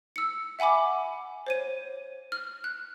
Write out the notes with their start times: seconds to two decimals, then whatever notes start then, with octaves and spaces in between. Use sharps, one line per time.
0.16 E6 C#7
0.59 E5 F#5 G#5 B5 D6
1.47 C5 C#5 D#7
2.32 F6
2.64 F#6